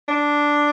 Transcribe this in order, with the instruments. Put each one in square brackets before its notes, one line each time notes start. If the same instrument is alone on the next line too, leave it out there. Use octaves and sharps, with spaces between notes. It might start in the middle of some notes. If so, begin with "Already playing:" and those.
[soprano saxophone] D4